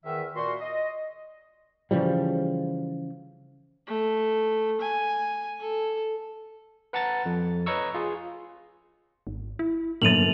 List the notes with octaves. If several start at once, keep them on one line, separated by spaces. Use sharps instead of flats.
E2 D#3 E5
A#2 F#4 C6
D#5
C#3 E3 F3 G3
A3
G#5
A4
B4 F#5 A5 A#5 A6
F2
B4 C#5 D#5 A#5 C#6 E6
F4 G#4
G#1
E4
G1 F#2 A#3 A6 D#7 F7 F#7